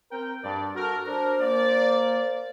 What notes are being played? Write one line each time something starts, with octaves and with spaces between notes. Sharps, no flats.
C4 A#4 G5
G2 D5
F#4 A4 A#4
D4 A#4 C5
A#3 D5